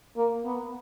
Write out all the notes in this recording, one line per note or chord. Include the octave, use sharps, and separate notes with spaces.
A#3
B3